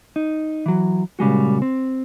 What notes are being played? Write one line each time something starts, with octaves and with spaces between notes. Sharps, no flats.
D#4
E3 F#3
A#2 C#3 G3 G#3 F#4
C4